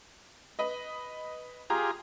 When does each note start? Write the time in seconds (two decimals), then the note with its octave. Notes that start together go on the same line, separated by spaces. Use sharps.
0.59 B4 D#5
1.70 F4 G4 G#4 A#5